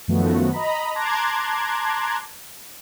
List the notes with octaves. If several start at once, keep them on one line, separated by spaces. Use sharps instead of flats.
F#2 D#3 F3 A3 B3 F#4
D#5 A#5 B5
A5 A#5 C6 D6 F#6 G#6